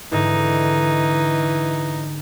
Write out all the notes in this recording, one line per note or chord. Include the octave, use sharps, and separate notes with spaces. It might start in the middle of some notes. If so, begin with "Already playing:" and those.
G#2 D3 E3 D#4